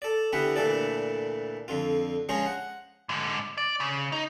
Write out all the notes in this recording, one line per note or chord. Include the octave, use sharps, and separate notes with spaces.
A4 D5
D3 E3 B3 G4 E5 F#5
D2 A#2 E3 A4 D5
F2 D3 F4
F3 G#3 C#4 G#4 C5 A#5
F#5
G#2 D3
D5
C#3
D#4